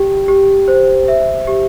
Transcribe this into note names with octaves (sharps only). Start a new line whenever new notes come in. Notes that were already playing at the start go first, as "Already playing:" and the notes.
Already playing: G4 G5
G4
C5
E5
G4